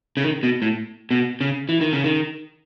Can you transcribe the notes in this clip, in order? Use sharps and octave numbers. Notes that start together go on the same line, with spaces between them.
C#3
D#3
B2
A2
B2
C#3
E3
D#3
C#3
D#3